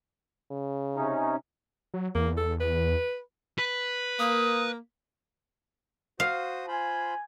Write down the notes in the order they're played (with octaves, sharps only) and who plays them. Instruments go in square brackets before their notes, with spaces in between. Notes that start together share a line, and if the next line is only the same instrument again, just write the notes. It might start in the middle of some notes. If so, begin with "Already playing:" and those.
[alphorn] C#3
[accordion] C3 C#4 D#4
[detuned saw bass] F#3
[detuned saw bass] E2 [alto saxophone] A#3
[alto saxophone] A4
B4
[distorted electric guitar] B4
[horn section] A#3 [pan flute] D#6
[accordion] F#4 C5 D#6 [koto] F5
[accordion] F4 C5 B5 [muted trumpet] G#5